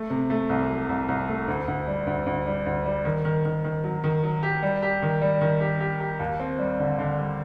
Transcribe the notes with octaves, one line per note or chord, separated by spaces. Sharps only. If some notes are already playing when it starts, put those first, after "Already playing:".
Already playing: A3
C3
A3
C2
F#3
C2
C2
A3
D2
D2
G3
D2
D2
G3
D2
G3
D#3
D#3
D#3
D#3
F#3
D#3
F#3
G4
G3
G4
D#3
G3
D#3
G4
G4
G4
D#2
C4
G3
D3
D3
G3